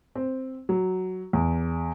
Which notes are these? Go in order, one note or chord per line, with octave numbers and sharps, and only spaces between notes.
C4
F#3
E2